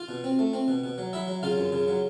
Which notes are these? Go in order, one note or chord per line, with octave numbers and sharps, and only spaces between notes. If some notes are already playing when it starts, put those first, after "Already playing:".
Already playing: F4 F5
B2
C4
A3
C4
B2
B2
F#3
F#3 E4 E5
F#3
C#3 F4 F5
F#2
C#3
F#3